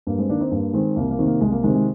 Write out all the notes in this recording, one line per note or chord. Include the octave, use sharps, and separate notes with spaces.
G2 A#3
G#3 C4
D#3 A#3 D4
C4 D#4
G2 A#3
D#3 G#3 C4
C2 A#3
A#3
C3 D#3
A#3
C2 G#3
A#3
C3 D#3 G#3
G#3